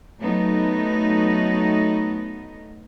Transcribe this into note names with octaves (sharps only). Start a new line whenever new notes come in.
F#3 A3 B3 D#4